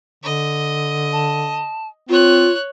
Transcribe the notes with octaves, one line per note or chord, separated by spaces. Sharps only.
D3 D#5
A5
C4 F4 C#5 F#6